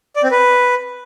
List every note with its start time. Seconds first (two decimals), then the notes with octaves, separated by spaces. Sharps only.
0.16 D5
0.24 C4
0.31 B4